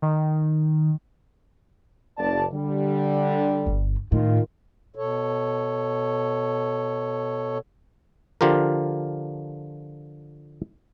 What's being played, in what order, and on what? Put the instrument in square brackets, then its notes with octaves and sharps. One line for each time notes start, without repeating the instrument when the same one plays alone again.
[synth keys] D#3
[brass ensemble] F#1 D5 A5
D3 G3
[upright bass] G1
[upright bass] A2 [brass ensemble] D#3 F4
[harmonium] B2 A4 C#5
[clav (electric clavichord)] D3 F3 F4 G4 A#4